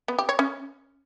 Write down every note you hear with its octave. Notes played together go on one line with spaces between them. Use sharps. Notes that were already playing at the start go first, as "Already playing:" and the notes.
B3
G4
C#5
C#4